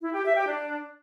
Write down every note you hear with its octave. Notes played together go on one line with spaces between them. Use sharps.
E4
G4
E5
G4
D4